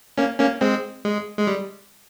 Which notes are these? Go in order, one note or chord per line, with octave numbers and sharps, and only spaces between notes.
A#3 C#4
A#3 C#4
G#3 C4
G#3
G#3
G3